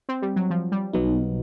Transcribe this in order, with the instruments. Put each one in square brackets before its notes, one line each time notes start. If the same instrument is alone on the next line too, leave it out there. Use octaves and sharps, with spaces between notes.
[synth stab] C4
G3
F#3
F3
G3
[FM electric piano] B1 B2 F#3 B3 D#4